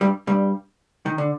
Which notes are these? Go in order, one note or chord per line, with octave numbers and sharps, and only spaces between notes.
G2 G3
G2 G3
D#3
D3